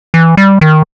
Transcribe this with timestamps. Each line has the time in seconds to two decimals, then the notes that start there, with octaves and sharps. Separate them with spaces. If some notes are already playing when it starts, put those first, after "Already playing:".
0.14 E3
0.37 G3
0.61 D#3